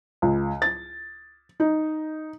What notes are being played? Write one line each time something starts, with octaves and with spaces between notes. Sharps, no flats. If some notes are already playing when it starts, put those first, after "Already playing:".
C#2
A6
D#4